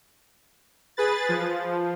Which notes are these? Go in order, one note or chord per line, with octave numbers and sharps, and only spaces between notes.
G#4 B4 A6
F3